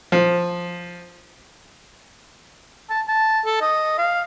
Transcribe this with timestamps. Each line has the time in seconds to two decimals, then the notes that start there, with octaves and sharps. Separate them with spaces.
0.12 F3
2.90 A5
3.08 A5
3.45 A4
3.61 D#5
3.98 F5